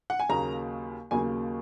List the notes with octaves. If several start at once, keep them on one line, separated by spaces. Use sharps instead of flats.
F#5
G#5
D#2 C#3 F#3 A#3 A#5
D#2 C#3 F#3 A#3 G#5